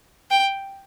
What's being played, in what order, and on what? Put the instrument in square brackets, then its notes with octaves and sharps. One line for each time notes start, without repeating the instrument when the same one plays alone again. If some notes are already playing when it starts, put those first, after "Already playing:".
[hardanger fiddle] G5